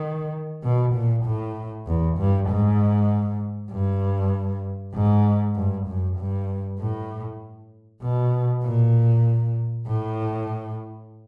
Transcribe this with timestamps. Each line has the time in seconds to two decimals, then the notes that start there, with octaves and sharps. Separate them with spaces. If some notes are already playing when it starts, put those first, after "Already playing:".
Already playing: D#3
0.63 B2
0.94 A#2
1.25 A2
1.87 E2
2.18 G2
2.49 G#2
3.72 G2
4.95 G#2
5.56 G2
5.87 F#2
6.18 G2
6.79 A2
8.03 B2
8.64 A#2
9.87 A2